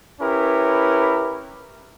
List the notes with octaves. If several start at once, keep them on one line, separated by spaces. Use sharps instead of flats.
C#4 E4 G4 A#4 B4